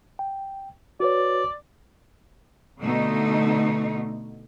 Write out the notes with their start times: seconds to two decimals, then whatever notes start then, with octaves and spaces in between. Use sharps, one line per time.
0.19 G5
1.00 F#4 B4 C#5 D5
2.81 B2 D3 A3 D#4